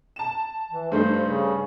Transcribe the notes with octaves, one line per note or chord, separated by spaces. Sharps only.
A5 E7
E3
G2 A3 D#4 C5
C#3